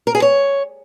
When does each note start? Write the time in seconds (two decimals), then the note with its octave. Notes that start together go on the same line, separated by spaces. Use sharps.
0.07 A#4
0.15 G#4
0.22 C#5